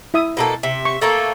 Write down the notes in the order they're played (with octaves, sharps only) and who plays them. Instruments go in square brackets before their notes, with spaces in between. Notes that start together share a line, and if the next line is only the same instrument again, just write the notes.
[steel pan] E4 E5 D#6
[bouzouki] B2 A#3 A4
[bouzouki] C3 [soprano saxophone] E5
[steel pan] C#6
[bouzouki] A3 A#3 C#5 [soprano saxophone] A4